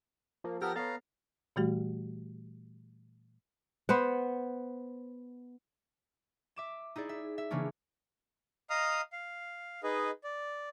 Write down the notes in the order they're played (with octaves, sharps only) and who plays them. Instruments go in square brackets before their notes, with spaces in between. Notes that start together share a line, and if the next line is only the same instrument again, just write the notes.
[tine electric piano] F3 [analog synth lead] A#3
[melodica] B3 A4 A#4 [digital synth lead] G4 [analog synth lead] A#6
[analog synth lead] B3 [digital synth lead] A4 [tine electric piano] C#5 A6 [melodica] F5 A#5
[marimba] A#2 E3 G3 A3 F#4 G4
[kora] B3 C5 F#5
[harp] E5 D6 E7
D#4 E4 G#4 D5
E5
E5
C#3 E3 A#3 C#4 D4
[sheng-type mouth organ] D#5 F5 A#5 D#6 F6
F5
D#4 G#4 B4 D#5
D5